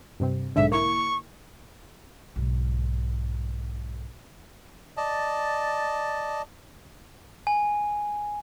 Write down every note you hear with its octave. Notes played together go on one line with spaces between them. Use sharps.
G2 C3 C4
B1 G#2 D3 E5
A#3 E4 C#6
B1 G#2
D5 D#5 A5
G#5